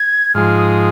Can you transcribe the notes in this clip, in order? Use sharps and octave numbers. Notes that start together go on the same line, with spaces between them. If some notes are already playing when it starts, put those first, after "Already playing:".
Already playing: G#6
G#2 F3 G#3 F6
D#6